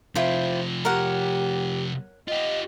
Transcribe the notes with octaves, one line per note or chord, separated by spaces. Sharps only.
C3 F3 E4 F4 C5 G5
G4 A#4 C#5 F#5
F4 G4 D#5